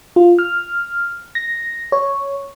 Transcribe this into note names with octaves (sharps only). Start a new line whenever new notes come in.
F4
F6
A#6
C#5